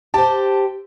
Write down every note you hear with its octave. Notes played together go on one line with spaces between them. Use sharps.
G4 C5 A5